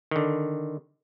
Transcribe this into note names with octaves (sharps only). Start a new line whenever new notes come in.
D3 D#3